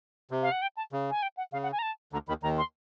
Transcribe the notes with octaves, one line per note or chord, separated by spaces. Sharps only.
C3
F5
F#5
G5
A5
C#3
G#5
G5
F#5
C#3 F5
F#5
G#5
A#5
A5
D2 D3 A#5
D#2 D#3 B5
D#2 D#3 A#5
C6